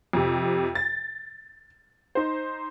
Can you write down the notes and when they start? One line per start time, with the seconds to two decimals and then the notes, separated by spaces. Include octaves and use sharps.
0.13 F2 C3
0.75 A6
2.15 D#4 C5